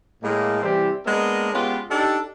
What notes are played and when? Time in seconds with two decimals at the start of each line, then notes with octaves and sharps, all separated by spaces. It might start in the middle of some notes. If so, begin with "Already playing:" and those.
0.22 A2 G#3 A#3
0.62 C3 E3 G3 C4 E4 G4
1.05 G#3 A#3 B3 D4 A#4 D#5
1.53 G#3 B3 C#4 F4 G4 B4
1.90 D4 D#4 G4 A4